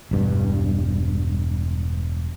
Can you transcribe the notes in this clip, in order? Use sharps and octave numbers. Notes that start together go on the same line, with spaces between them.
E1 G2